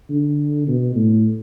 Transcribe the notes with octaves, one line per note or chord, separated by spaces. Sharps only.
D3
B2
A2